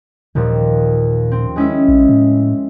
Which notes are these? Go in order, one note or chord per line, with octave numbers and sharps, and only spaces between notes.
D#2 A#2 F3 G3
C4
G#3 C#4 E4
A#1
A2